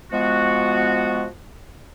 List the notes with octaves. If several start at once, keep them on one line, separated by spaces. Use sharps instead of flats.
F3 G#3 B3 F#4